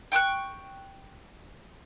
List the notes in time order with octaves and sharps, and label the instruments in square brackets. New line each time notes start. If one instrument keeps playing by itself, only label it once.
[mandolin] G5 C#6 E6 F#6